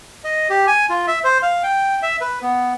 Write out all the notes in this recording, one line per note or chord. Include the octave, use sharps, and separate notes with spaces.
D#5
G4
G#5
F4
E5
C5
F5
G5
E5
B4
B3